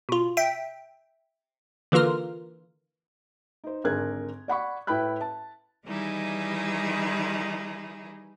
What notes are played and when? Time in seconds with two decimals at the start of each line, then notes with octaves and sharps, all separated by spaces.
0.09 B2 F4
0.37 E5 G5
1.92 D3 E3 A#3 F4 A#4
3.64 D#4 C5
3.84 G#1 D3 G#4 A#4 F#6 G#6
4.48 D5 F#5 B5 C#6
4.87 A2 E4 B4 G5 B5 F#6
5.21 A5
5.85 D#3 E3 G3 D#4 E4 G#4